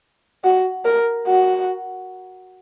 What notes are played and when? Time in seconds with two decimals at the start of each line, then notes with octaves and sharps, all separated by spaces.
0.44 F#4
0.85 A#4
1.27 F#4